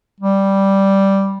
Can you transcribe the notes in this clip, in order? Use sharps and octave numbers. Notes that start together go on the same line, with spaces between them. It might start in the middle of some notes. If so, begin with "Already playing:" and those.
G3